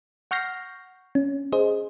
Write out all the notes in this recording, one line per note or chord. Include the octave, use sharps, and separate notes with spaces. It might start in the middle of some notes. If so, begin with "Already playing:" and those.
F#5 C#6 F6 G6 A#6 C7
C#4
G#4 C5 D#5